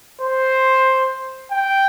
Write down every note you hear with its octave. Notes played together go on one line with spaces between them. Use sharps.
C5
G5